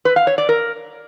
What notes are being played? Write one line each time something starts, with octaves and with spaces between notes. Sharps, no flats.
B4
F5
C#5
D5
A#4